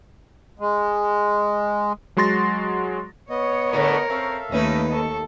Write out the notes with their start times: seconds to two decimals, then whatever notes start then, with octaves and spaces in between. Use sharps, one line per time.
0.59 G#3
2.17 F#3 G#3 F#4 C6 A6 A#6
3.30 B3 C#5 D#5
3.73 A2 D3 A3 A#4
4.10 C4 A4 E5 F5
4.52 D#2 A3 C#4 D#4 B4
4.93 A4 C#6